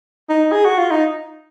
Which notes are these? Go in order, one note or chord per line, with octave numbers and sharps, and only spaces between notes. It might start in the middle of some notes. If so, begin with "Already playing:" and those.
D#4
G#4
F#4
F4
D#4